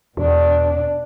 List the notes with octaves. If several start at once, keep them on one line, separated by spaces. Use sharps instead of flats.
E2 B2 D4